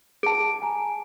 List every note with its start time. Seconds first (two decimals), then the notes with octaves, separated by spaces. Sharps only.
0.23 G#4 A5 D7
0.62 G#5 A#5